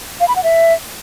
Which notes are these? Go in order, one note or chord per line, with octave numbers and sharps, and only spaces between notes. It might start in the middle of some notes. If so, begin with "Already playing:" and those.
F5
B5
F#5
E5